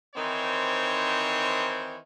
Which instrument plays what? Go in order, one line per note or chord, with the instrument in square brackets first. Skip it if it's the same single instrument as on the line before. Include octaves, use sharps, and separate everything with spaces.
[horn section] D#3 E3 C4 D#4 C5 C#5